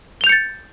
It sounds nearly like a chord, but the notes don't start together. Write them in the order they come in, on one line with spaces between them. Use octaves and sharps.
G7 F7 G6 C#7 A6